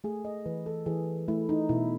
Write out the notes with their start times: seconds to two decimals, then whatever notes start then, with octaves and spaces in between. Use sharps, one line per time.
0.04 A3 G#4
0.25 D#5
0.46 E3 B4
0.66 A4
0.86 E3 G#4
1.28 A3 E4
1.49 D#4
1.69 B2 E4